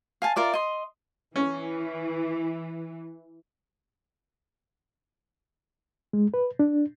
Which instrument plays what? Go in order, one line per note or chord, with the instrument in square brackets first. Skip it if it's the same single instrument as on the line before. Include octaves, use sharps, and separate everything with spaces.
[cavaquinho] F5 G#5 A5
F4 A#4 D5 E5
D#5 C6
[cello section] E3 [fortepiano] C#4
[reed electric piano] G#3
B4
D4